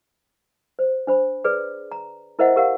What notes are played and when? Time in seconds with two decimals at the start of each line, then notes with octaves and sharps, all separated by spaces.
0.79 C5
1.07 D4 C5 B5
1.44 G#4 B4 D5
1.92 A#5
2.39 E4 A#4 C5 D#5 E5 F#5
2.56 G4 A#4 F5 F#5